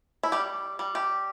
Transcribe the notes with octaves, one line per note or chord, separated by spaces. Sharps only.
E4
G3 G4
G3
G4